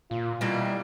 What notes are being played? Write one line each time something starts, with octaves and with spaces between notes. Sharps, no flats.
A#2 F4
B2 E3 G3 A#3